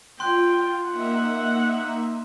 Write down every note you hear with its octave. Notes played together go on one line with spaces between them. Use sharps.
F4 G5 C6 F#6
A#3 D#4 E5 F#5